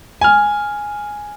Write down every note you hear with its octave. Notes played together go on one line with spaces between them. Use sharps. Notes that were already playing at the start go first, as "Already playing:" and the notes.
G#5 F6